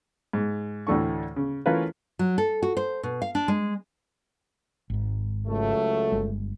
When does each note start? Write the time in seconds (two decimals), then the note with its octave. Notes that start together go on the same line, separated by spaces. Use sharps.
0.33 G#2
0.87 D2 A2 E3 A3 D4 C#6
1.36 C#3
1.66 E3 A3 C#4 F4 A#4 B4
2.19 F#3
2.38 A4
2.63 F#4
2.77 C5
3.03 B2
3.22 F5
3.35 D4
3.48 G#3
4.90 G#1 G#2
5.47 C#2 F#3 A3
6.12 G1 G#3